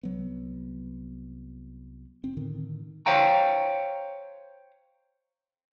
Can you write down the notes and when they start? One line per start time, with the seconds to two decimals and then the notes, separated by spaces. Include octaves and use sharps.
0.03 C2 F#3 B3
2.23 F1 C4
2.37 A2 D3 D#3
3.06 C5 C#5 F5 G5 A#5